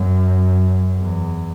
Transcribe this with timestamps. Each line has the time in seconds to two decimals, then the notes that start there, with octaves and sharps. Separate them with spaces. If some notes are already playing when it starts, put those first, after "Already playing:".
Already playing: F#2
0.97 E2